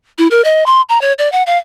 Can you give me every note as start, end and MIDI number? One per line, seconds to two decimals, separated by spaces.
0.18 0.27 64
0.31 0.43 70
0.45 0.66 75
0.66 0.81 84
0.89 1.01 82
1.01 1.13 73
1.19 1.30 74
1.32 1.43 78
1.47 1.58 77